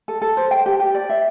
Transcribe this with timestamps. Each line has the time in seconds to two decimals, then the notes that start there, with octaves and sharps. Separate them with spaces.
0.08 A4
0.22 A4
0.37 C5
0.51 G5
0.66 G4
0.79 G4
0.95 D5
1.09 E5